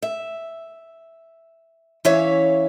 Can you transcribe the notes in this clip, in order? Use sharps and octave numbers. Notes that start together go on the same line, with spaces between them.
E5
E3 C#4 C#5 E5 F5